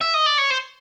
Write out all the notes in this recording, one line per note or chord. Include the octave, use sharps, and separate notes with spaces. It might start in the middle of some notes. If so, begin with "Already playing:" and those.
E5
D#5
D5
C#5
C5